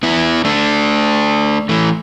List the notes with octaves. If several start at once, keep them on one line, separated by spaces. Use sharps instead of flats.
B3 E4
A3 D4
E3 A3